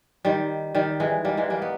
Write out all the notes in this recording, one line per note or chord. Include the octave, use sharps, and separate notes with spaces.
D#3 G3
D#3 G3
E3 G#3
G3 A#3
E3 G#3
G3 A#3
B3